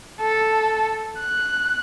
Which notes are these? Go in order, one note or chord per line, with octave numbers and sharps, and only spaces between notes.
A4
F#6